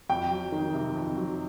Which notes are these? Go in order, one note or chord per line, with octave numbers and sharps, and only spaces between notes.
F2 G5
F#3
D#3
C3
F2
F#3